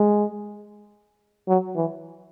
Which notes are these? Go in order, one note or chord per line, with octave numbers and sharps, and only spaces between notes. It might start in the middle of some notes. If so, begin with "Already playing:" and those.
Already playing: G#3
F#3
E3